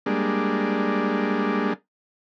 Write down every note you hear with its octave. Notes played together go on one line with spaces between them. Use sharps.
G3 G#3 A#3 D4